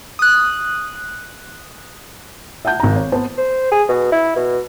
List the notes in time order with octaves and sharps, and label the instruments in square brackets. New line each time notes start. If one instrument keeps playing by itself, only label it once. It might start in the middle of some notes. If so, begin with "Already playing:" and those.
[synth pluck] D#6 F#6
[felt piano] E5 F#5 A5 G6
G#1 A#5
C#5
B3 C5 A5
[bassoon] C5
G#4
B2
E4
B2